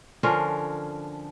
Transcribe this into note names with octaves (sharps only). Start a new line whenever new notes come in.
D3 F3 C#4 A#4